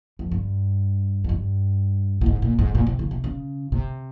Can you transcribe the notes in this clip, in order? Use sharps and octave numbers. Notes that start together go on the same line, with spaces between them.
F2
G2
F2
G2
A#2
G#2
A#2
G#2
A#2
C3
C#3
C3
C#3
C3